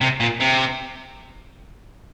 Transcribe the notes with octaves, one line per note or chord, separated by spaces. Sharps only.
C3
A#2
C3